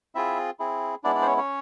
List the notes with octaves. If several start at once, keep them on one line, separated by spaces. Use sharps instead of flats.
C4 E4 F4 G#4 E5
C4 E4 G#4
G#3 B3 D4 E4 D5
D4 D5
C5
C#4 C#5
C#4 C#5